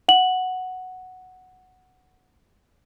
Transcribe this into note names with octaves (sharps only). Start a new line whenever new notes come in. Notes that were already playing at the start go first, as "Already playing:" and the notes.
F#5 F#7